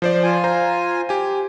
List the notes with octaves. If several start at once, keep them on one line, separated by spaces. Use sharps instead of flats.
F3 C5 D5
F4 G#5
C5 A#5
G4 G#5